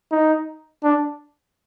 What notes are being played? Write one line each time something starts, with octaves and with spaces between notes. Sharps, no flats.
D#4
D4